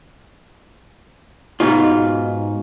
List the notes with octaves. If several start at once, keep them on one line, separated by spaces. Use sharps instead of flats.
G#2 B2 D#4 F4